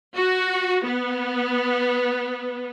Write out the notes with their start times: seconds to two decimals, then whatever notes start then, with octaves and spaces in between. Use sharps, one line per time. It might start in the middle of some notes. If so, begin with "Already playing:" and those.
0.15 F#4
0.84 B3